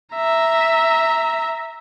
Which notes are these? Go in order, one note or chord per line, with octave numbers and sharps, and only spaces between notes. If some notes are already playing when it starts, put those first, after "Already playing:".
E5 A#5